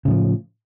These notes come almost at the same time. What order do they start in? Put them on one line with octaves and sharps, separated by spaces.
C#3 A2 F3